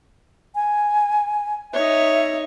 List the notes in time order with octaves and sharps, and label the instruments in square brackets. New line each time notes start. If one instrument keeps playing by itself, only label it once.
[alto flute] G#5
[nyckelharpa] D#4 C#5 [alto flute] E5